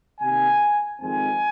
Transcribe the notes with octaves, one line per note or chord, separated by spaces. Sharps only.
C3 D#3 A#3 G#5
F2 D#3 G#3 C4 G#5